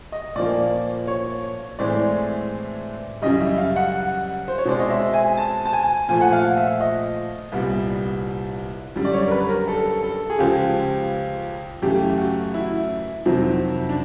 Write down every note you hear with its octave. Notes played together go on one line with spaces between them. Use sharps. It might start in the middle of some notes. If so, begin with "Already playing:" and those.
D#5
A#2 F3 A#3 D5
C#5
A2 E3 G#3 C4 D5
F#2 C#3 E3 G3 D#5
E5
F5
F#5
C5
C#5
B2 G#3 C4 D5
D#5
E5
G#5
A5
A5
G#5
A#2 F3 A3 G#5
F#5
F5
E5
D#5
C2 A#2 G3 B3
F#2 D3 G3
D5
C#5
A#4
B4
A#4
A4
A4
G#4
C#2 C#3 F3 G4
F#2 C#3 E3 A3 G4
G4
F#4
E4
F2 C3 D#3 F#3
D4